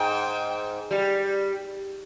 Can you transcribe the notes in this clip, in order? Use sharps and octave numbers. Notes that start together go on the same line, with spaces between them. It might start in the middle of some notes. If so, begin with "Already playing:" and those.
Already playing: G#2 G5
G3